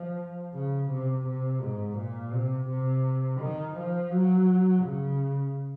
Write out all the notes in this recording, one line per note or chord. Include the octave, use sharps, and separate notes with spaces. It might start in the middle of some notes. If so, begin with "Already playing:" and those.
Already playing: F3
C#3
C3
C3
G#2
A#2
C3
C3
D#3
F3
F#3
C#3